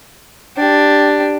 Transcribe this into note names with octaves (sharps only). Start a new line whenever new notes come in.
D4 G4